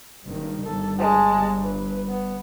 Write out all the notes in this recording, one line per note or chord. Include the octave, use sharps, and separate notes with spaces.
F#1 G2 D#3
G1 G2 A4
G#3 A5
B4
B3